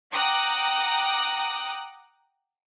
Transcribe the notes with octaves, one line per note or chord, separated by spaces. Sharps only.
F#5 G5 A#5 D6 D#6 F#6